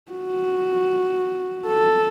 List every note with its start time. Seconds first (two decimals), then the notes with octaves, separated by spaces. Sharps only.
0.12 F#4
1.67 A4